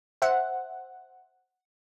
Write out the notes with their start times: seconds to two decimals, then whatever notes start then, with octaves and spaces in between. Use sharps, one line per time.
0.22 C5 E5 F#5